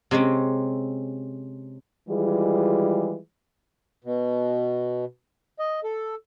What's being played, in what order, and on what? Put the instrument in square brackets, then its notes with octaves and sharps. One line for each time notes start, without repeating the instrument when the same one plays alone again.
[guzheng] C3 G#3 C4 C#4
[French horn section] D#3 E3 G3 G#3 F4 G#4
[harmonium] B2
D#5
A4